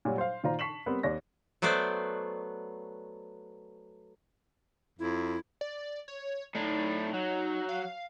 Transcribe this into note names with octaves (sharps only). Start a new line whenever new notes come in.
A#2 F#3 G3 F#4
C5 F5
A#2 D#3 F4 C5 D5 A#5
A5 C#6 B6 C7 E7 F#7
G3 B3 C4 A#4 B4
D#2 D5 A#6
F#3 A3 B3 C5 D5
F2 E4
D5
C#5
A2 D4 D#4
F#3
F5